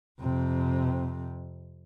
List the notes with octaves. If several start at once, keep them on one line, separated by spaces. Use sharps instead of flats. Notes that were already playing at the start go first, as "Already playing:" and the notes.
F2 C3